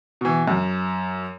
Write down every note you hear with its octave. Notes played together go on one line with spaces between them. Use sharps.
B2 E3
F#2